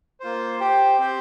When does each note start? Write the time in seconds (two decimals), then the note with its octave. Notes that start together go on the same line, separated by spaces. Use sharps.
0.20 A#3 F4 C5
0.60 G4 C5 G5
0.99 C4 G4 C5 G5